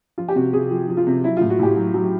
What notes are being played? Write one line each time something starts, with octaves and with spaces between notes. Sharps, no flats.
F3 F4
G4
C3 F#4
C3 G#4
F3
F3
F4
C3
F#3 E4
A2 F4
F#4
A2 G4
F#3
F#3